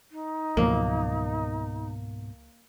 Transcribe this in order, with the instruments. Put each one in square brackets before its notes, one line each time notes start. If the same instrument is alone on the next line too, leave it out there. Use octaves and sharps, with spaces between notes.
[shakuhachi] D#4
[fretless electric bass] C#2 F3 F#3 [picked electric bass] G#2 B2 [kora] A#3